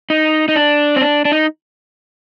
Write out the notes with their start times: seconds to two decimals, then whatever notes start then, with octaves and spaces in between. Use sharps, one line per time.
0.10 D#4
0.48 D#4
0.56 D4
0.96 C4
1.01 D4
1.25 D4
1.32 D#4